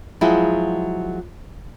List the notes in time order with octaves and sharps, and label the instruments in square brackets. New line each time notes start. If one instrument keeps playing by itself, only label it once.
[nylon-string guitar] F3 F#3 G#3 E4 F#4 G#4